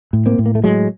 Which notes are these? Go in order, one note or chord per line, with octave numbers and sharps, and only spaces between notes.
A2
A#3 C4
A2
A#3
A3
A2 F#3 G#3